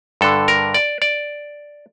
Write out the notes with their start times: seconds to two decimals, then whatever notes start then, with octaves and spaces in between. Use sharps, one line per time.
0.21 G2 D3 A4
0.48 A#4
0.74 D5
1.02 D5